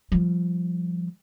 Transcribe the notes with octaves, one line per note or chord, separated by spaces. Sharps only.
F3 G3